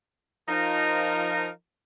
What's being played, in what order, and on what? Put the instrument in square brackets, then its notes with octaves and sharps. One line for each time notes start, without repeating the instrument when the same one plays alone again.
[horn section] F3 D#4 A#4